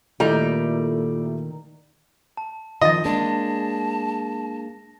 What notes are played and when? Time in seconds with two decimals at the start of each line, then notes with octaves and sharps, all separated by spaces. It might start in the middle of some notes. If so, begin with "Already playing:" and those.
0.20 A#2 D#3 G3 A3 E4 A#5
2.37 A5
2.82 D#3 F3 D#5 A6 A#6
3.05 G#3 A#3 D4 A5